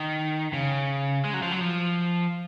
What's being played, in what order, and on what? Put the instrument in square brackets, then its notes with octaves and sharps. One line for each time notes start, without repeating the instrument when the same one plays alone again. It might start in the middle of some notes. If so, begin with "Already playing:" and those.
Already playing: [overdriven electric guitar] D#3
C#3
G#3
F#3
F3
F#3
F3